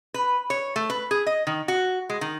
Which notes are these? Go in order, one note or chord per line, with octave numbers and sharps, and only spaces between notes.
B4
C#5
A3
B4
G#4
D#5
D#3
F#4
G#3
D#3